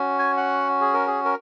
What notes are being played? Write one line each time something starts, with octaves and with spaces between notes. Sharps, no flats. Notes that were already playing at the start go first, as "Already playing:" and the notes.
Already playing: C#4 F#4
G#5
F#5
G#4
A#4
G#4
A#4